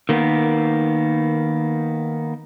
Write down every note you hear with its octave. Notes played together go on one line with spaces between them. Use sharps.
D#3 A#3 B3